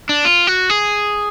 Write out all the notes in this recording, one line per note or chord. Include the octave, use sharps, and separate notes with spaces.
D4
F4
F#4
G#4